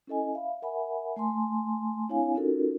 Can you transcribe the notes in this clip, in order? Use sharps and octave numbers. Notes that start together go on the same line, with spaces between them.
C#4 E4 A4 D#5 G#5
E5 F5 B5
A#4 E5 F#5 G#5 B5
A3 G#5 A5 C6
C4 D4 E4 C#5 F5 G#5
C#4 D#4 F4 F#4 A4 A#4